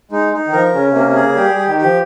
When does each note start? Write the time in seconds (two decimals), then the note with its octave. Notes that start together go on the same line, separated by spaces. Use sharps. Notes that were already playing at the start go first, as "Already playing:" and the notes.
0.11 G#3 D#4
0.33 D#4
0.47 D#3
0.52 F3 A#4
0.73 C#3 C#4
0.89 C3
0.95 A#3
1.05 C3
1.15 G#4
1.20 C#3
1.36 G3 G4
1.51 G3
1.56 G4
1.67 D#3
1.77 F3 G4